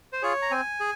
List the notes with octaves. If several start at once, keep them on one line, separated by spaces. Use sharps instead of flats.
C5
F4 G#4 C#5
A#5
C4 G#5
G#4